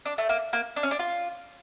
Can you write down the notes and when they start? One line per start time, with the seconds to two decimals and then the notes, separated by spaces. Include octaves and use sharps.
0.06 D4
0.18 A3
0.29 A#3
0.53 A#3
0.76 D4
0.83 C#4
0.91 D4
0.99 F4